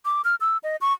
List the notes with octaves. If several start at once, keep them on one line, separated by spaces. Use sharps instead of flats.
D6
F6
E6
D#5
C#6